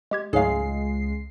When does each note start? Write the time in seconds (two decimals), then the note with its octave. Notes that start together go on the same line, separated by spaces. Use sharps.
0.11 G#3 G4 G#6
0.33 C#2 G#2 F#3 G#3 A3 G#4 F5 C7